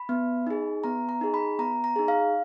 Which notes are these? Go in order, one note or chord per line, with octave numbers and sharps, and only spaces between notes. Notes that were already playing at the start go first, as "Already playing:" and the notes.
Already playing: B5
B3
D#4 G#4
B3 A#5
A#5
D#4 G#4
B5
B3 A#5
A#5
D#4 G#4
F5